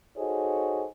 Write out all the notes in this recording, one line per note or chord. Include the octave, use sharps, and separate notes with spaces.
D#4 F#4 G#4 A4 C5 C#5